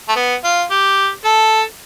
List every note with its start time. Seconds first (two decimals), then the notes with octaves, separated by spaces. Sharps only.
0.09 A3
0.16 B3
0.44 F4
0.71 G4
1.25 A4